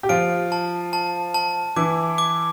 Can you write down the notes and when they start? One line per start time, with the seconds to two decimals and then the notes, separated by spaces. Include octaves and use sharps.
0.03 G4
0.09 F3 F4 D7
0.52 A5
0.93 A5
1.34 A5
1.76 E3 E4 D6
2.18 D6